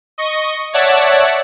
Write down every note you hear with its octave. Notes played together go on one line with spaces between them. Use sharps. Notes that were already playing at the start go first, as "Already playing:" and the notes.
D#5 C#6
C#5 D5 E5 F#5 A5